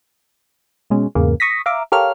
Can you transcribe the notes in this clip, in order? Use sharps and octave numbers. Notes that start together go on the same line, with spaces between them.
B2 G#3 C#4
E2 G#2 C#3 A#3
C#6 D#6 A#6 B6
E5 F5 A#5 D6
G4 A4 A#4 C#5 F5 F6